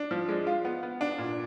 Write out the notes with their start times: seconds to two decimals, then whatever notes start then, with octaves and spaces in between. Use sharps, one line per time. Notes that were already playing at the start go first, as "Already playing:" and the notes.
Already playing: D4
0.11 F3
0.29 G#3
0.47 F4
0.65 B3
0.83 B3
1.01 D4
1.18 A#2